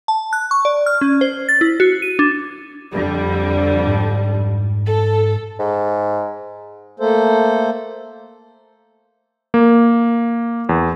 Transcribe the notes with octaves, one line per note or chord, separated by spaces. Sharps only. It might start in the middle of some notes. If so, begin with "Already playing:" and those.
A5
F#6
C#6
D5
F6
C#4
C5
A6
E4
F#4
D#7
D4
F2 D3 G3
G#2
A4
G#2
A3 A#3 A4 C5
A#3
E2